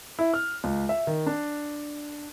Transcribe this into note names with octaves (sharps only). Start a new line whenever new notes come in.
E4
F6
C#2
E5
D#3
D4